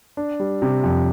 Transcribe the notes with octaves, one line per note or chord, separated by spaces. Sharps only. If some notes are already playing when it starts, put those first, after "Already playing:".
D4
G3
C3
F2